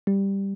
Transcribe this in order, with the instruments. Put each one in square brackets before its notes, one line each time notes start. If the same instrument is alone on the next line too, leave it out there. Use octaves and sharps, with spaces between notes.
[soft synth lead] G3